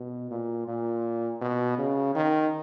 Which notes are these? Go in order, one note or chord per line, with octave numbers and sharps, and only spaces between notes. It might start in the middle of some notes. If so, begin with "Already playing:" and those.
Already playing: B2
A#2
A#2
B2
C#3
D#3